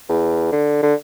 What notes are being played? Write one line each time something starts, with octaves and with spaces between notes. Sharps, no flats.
E2
D3
D3